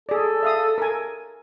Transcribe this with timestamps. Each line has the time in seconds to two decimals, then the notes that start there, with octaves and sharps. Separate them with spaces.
0.09 G#4 A4 D5
0.43 E5 F5 D#6
0.78 A#4 G#5